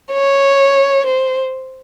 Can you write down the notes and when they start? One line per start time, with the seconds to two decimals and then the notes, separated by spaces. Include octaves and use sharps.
0.12 C#5
1.06 C5